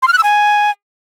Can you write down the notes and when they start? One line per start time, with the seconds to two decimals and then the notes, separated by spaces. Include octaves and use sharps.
0.02 C6
0.08 F6
0.13 F#6
0.18 E6
0.23 G#5